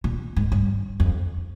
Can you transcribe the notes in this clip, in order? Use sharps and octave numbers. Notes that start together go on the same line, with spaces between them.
A#2
G#2
G2
F2